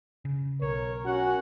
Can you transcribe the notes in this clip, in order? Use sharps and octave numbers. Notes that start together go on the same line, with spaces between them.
C#3
B1 A#4 C#5
C#4 F#4 F#5